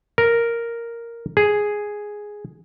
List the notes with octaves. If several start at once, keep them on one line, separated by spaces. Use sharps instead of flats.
A#4
G#4